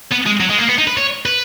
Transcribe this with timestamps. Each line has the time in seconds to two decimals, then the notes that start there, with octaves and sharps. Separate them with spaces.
0.11 B3
0.26 G#3
0.40 F#3
0.50 G#3
0.58 A#3
0.69 B3
0.78 D#4
0.87 B4
0.97 C#5
1.26 B4